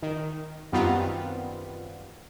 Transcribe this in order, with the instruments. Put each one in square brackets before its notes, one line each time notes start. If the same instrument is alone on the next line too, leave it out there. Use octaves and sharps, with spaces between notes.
[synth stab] D#3
F#2 D#3 G3 B3 C4 F4